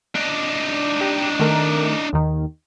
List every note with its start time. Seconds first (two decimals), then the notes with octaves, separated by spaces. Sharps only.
0.15 D4 D#4
1.01 G4
1.39 D#3 A3 A#4
2.13 D#2 D#3